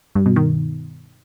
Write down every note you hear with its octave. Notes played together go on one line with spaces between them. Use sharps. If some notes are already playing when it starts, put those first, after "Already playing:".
G2
B2
D#3